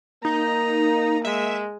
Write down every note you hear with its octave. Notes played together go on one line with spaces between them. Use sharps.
A#3 D#4 A#5
G#3 E5